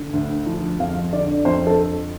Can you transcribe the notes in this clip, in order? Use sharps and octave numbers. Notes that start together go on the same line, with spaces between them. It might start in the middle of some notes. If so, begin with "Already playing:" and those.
Already playing: D3
D2
F3
F2 F5
D3 D5
F2 C5
A4